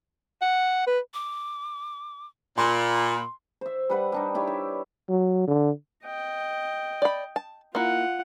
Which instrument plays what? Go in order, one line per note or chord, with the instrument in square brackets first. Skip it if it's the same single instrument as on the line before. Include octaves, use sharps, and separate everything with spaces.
[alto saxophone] F#5
B4
[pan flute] D6
[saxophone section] A#2 [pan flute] B5 [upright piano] C6
[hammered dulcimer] C5 E5
G3 B4 F#5
G3 D4 D#4
D#4 E4 G4 C#5
E5
[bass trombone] F#3
D3
[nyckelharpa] D#5 G5
[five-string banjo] D5 B5
A5
[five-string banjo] A#3 E4 [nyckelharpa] F4 F#5